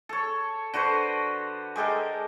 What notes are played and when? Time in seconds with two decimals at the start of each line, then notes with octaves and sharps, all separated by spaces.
0.09 A4 C#5
0.74 D3 F#4 B4 C5
1.76 G#3 G4 A4 A#4